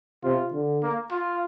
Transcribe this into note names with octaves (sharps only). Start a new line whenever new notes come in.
C3 F4
D3
A#3
F4